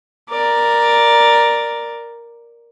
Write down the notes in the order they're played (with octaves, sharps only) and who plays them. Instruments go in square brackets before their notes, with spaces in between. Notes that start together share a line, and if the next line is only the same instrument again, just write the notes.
[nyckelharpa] A#4 D5